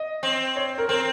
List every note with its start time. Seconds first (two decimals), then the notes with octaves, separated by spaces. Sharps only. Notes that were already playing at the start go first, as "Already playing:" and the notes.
Already playing: D#5
0.23 C4
0.56 C#5
0.78 A#4
0.88 C4 A#4